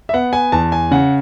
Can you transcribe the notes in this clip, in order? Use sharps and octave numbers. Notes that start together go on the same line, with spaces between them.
E5
B3 F#5
G#5
E2 A5
G#5
C#3 F#5